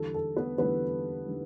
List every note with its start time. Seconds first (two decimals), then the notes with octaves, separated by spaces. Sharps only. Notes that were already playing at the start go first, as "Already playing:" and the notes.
Already playing: E2 D3 G3 A4
0.14 A4
0.36 B3 B4
0.58 E2 D3 G3 B3 B4
1.27 D3 G3